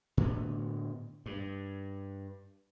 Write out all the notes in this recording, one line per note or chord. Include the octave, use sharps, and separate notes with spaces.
A2 D3 B3
G2